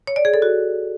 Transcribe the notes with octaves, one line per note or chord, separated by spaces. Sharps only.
C#5
D5
G#4
A4
F#4